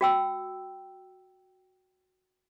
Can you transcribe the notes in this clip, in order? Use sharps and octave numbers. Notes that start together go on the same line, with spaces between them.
F#4 G5 E6